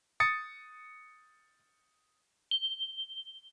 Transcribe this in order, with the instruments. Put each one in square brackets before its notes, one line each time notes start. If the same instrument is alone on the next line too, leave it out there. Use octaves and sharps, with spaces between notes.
[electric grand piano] D#6 A6 C#7
[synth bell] G7